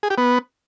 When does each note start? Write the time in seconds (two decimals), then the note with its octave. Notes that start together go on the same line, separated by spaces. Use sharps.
0.03 G#4
0.10 G4
0.18 B3